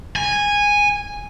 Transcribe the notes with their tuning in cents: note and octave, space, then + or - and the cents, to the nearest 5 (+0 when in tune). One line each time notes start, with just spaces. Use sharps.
G#5 -10